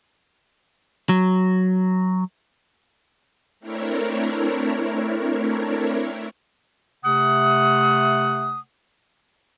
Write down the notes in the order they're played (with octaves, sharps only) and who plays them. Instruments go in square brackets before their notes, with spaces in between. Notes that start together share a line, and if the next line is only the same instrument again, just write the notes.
[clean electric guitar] F#3
[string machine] A3 C4 D4 E4 A#4 C#5
[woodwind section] C3 A3 F#5 D#6